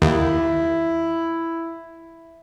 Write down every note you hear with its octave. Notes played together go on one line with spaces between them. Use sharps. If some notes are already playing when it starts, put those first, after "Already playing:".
D#2 E4